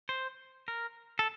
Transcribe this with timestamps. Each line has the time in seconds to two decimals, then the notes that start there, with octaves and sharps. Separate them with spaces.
0.09 C5
0.68 A#4
1.19 A4